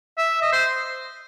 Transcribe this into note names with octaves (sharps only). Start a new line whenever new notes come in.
E5
D#5
C5